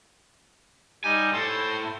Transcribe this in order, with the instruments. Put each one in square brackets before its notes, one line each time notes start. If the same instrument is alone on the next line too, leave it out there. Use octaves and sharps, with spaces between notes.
[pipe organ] G3 D#4 G4 [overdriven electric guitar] G#5
[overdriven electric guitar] A2 A4 [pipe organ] C5 C6